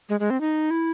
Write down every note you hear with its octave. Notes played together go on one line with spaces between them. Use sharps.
G#3
G#3
C4
D#4
E4